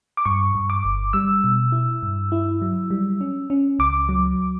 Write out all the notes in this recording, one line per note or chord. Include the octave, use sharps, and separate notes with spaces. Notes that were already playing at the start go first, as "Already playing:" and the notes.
D6
G2 C#6
G2
D6
G1
G3 E6
B2
E4
G2
E4
F#3
G3
C#4
C#4
C#2 D6
F#3